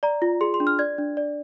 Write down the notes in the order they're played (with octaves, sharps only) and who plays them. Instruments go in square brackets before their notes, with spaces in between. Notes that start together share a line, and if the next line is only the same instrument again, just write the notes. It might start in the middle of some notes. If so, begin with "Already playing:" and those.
[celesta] D5 A#5
F4
G#4 C6
C6
D4
F6
D5 G#6
D4
D5